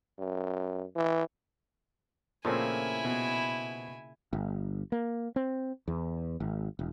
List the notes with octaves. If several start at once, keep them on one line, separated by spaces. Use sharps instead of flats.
F#2
E3
A#2 C#3 F3 A3 A#3 C4 E4 G#5
B2
G1
A#3
C4
E2
G#1
E1